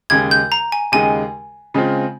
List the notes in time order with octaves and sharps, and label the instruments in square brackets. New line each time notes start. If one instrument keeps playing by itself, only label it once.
[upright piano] D#2 C#3 G#3 [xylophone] G#6
[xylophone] G6
A#5
G#5
[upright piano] D#2 C#3 G#3 D#4 G#4 [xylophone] G#5
[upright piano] C#3 G#3 C4 F4